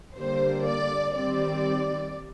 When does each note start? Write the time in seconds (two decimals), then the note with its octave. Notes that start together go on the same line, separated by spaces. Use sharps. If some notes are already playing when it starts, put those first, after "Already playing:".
0.17 D3 G3 A#3 C5
0.66 D5
1.16 D#3 G3 C4 D5